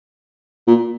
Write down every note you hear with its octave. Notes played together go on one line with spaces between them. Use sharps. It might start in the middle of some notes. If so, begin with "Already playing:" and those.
A#2